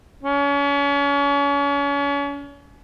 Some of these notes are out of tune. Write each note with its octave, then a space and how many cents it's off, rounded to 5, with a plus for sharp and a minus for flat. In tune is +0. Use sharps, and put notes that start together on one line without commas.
C#4 +35